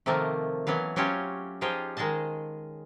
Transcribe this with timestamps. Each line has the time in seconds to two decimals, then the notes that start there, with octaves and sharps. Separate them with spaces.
0.06 C3 D#3 F3 A3 A#3
0.67 E3 F#3 B3 F5
0.96 F#3 C#4 F4 G4 C5 C#5
1.61 F3 D#4 F4 G4 G#4
1.97 D#3 G#3 G#4 D#5 A5